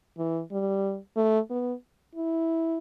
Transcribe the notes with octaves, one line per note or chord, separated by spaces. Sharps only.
E3
G3
A3
B3
E4